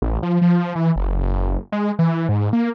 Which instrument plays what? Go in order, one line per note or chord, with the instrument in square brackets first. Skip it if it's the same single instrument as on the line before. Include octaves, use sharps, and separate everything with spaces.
[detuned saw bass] A1
F3
F3
E3
F#1
G#3
E3
G#2
A#3